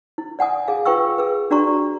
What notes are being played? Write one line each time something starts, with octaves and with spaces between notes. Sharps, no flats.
E4
D5 F#5 G#5 D#6
G#4 F5
F4 B4 G5 C#6 E6
G#4 B4
D4 F#4 D5 A#5 C#6